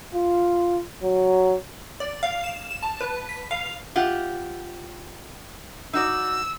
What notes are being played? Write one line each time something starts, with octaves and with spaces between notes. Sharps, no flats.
F4
F#3
D5
F5
E7
E7
A5
B4
B6
F5
F4 G4 F#5
D#4 F#4 D5 E6